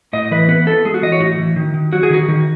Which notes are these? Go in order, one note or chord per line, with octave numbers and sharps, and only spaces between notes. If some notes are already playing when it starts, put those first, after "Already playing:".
A2 D#5
E3 B4
B3 B4
B3 A4
G#3 G#4
F#4
E3 D#5
C#5
A2 F#4
E3
D#3
D#3
F#3 F#4
G#4
D#3 F#4
D#3